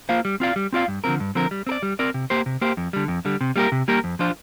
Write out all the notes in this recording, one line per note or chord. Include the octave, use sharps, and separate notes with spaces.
A#3 F4 C5 F5
G3
C4 F4 D5 F5
G3
C4 F4 D5 F5
G2
D3 F3 C4 A#4
G2
D3 F3 C4 A#4
G3
C4 A#4
D5
G3
C4 A#4 D5
C3
A#3 G4 C5
C3
A#3 G4 C5
F2
D3 G3
F2
D3 G3
C3
G3 A#3 G4 A#4
C3
G3 A#3 G4 A#4
F2
F3 D4 F4 C5